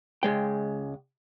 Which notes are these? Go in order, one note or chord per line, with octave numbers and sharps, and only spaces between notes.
C#2 G#3 G5